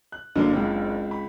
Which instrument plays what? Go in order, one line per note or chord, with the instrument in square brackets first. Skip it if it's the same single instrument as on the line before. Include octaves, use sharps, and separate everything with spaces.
[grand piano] F#6
[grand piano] F#1 D4 [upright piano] D3 F#3 A#3
[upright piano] C#2 C4
[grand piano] B5